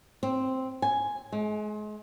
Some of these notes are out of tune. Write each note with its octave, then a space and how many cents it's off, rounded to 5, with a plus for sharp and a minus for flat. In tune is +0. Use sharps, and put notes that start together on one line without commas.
C4 +0
G#5 +0
G#3 +35